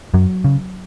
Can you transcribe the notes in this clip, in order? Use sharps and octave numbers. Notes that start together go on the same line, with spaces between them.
F#2 F#3
C#3